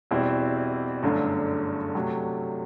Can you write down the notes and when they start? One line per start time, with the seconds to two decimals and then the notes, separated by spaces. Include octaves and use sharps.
0.11 E2 B2 G3 C4 E4
1.03 G1 F#2 D3 A3 D4
1.95 C3 F#3 A3